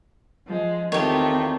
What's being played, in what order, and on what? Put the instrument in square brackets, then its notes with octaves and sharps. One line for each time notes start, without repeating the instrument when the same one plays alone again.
[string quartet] F3 G#3
[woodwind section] E2 D#3 [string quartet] A3 C4 F4 [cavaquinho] G4 C#5